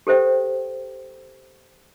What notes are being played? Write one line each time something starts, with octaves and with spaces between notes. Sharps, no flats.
G4 A4 C5 E5 G5